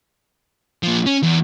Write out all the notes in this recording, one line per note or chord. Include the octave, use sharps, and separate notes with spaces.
A#2 F3
C#4
E2